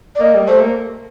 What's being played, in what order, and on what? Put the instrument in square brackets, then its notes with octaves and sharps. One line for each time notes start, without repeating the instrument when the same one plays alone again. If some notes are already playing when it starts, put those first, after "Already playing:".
[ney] D5
[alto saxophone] A#3 [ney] D#5
[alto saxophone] G3
[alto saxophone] A3 [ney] C5
[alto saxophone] A#3